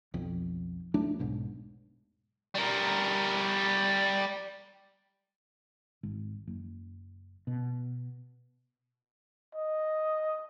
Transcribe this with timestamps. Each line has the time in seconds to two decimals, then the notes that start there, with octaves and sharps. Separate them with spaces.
0.14 B1 F2
0.94 E1 F#3 A3 D4
1.19 E1 B1 G#2 B2
2.55 G3 A#4
6.03 G#1
6.47 F#1
7.47 B2
9.55 D#5